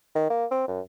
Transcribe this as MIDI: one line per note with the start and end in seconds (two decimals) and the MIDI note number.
0.15 0.27 51
0.30 0.45 58
0.51 0.64 60
0.68 0.80 42